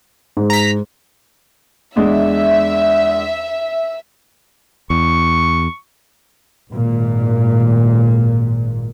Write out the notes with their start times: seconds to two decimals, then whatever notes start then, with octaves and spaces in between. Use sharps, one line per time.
0.37 G#2
0.50 A#5 B6
1.96 E2 G#3 D4 E5
4.90 E2 C#6
6.72 G#1 A#2